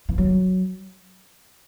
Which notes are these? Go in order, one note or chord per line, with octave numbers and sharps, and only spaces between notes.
E3
F#3